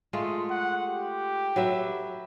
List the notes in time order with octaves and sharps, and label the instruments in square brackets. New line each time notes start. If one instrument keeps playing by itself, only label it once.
[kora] G#3 A3 F4
[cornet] F#5
G4
[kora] F#3 B4 E5